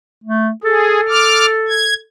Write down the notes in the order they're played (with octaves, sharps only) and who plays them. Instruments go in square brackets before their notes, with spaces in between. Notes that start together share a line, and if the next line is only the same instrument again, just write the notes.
[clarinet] A3
[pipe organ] G#4 [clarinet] A4
[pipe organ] D6 F6
G#6